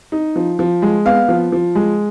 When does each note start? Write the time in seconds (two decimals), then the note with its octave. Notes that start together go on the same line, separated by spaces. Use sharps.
0.12 D#4
0.36 F3
0.59 F3
0.82 G#3
1.05 B3 F5
1.28 F3
1.52 F3
1.75 G#3